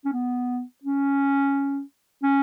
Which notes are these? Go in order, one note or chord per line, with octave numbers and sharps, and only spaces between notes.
C#4
B3
C#4
C#4